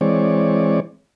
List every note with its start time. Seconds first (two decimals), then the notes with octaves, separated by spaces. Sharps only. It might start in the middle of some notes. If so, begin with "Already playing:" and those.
0.01 E3 G#3 C4 C#5 D5